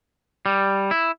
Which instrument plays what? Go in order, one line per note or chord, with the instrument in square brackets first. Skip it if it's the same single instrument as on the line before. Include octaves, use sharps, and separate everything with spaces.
[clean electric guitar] G3
E4